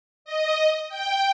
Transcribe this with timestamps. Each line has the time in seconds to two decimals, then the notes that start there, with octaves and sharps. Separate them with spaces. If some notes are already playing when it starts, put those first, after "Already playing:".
0.25 D#5
0.89 G5